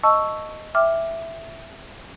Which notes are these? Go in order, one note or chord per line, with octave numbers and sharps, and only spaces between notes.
D#5 A5 C#6 E6
E5 G5 D6 F6